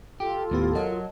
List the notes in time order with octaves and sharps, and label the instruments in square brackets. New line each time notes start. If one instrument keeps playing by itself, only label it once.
[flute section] F4 A4 [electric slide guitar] G4
[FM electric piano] D#2 B3 G4 [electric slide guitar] A2
[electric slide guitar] F#3 [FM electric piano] A#4 D#5 A5